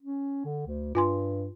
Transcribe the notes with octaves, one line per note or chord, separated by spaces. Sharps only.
C#4
D3
D2
G2 F4 G#5 C6